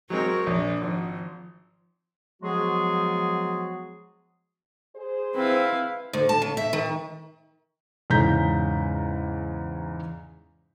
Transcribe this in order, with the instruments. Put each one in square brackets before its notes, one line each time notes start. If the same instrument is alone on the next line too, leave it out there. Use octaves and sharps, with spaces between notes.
[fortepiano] F#3 G#3 C4 [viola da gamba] A#4 C#5
[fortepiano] A#1 [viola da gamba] D4
[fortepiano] G#1 [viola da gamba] F3
[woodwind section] F3 F#3 G#3 B3 F#4 G#4
[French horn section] G#4 C5
[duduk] C4 [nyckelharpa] E4 F5 [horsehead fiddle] B4
[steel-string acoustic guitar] D2
A5
C#3
E5
D#3
[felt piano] E2 G#2 C#3 A#5 G6 B6